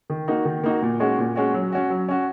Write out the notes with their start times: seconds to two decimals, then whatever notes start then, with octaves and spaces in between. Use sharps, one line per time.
0.10 D#3
0.28 A#3 D#4 F#4
0.45 D#3
0.63 A#3 D#4 F#4
0.82 A#2
1.00 G#3 C#4 F#4
1.18 A#2
1.36 G#3 C#4 F#4
1.54 F#3
1.72 C#4 F#4
1.90 F#3
2.09 C#4 F#4